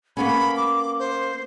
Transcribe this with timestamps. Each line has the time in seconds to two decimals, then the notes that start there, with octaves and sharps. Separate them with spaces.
0.17 A#3 B3 C#4 B5
0.56 D6
0.99 C5